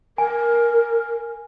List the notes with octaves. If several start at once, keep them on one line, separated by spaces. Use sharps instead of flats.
A#4 G#5